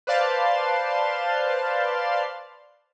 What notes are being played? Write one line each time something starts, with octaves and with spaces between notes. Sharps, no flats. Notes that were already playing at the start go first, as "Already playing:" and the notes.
B4 C5 D5 F5 A5 C6